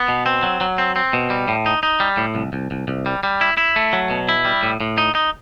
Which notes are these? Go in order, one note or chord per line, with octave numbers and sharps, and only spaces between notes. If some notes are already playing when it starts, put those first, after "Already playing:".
Already playing: B3
B2
C4
F#3
F#3
C4
C4
B2
G3
A2
D#4
D#4
G3
A2
C2
C2
C2
C2
G3
G3
E4
E4
A3
F#3
B2
E4
G3
A2
A2
D#4
D#4